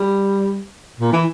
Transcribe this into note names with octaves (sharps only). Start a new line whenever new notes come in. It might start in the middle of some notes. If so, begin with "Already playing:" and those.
Already playing: G3
A#2
E3